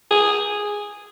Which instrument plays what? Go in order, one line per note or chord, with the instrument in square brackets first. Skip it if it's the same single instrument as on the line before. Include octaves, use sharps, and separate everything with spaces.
[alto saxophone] G#4